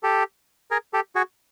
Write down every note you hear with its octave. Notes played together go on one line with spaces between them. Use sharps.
G4 A4
G#4 A#4
G4 A4
F#4 G#4